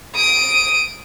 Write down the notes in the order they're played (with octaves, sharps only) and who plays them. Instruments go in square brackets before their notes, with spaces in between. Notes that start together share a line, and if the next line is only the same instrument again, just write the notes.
[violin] D#6 D7